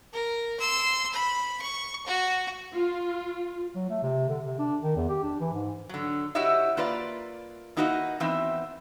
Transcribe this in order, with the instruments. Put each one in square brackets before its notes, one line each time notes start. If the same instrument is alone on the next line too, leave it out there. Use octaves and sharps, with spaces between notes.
[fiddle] A#4
C6 E6
B5
C#6
F#4
[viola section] F4
[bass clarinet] F#3
A3
C3
D3
C3
D4
D#3
E2
G4
D4
E3
G#2
[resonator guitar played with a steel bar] D3 F#3
E4 F#4 G4 C#5 D#5 E5
A#3 F4 B4 D5
A#3 D#4 E4 F#4 D5 D#5
E3 B3 C4 D#4 E5